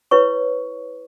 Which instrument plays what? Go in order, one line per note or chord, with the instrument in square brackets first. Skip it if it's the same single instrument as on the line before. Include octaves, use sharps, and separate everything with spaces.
[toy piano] E4 B4 C#5 C#6